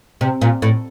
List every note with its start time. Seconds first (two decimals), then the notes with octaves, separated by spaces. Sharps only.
0.21 C3
0.41 A#2
0.62 A2